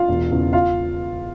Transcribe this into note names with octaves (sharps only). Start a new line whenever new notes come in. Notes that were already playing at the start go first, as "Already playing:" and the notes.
Already playing: F4 F5
E1
E2 C#3
F4 F5